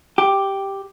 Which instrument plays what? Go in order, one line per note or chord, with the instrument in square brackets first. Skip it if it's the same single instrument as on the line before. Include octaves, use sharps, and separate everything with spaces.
[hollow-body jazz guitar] G4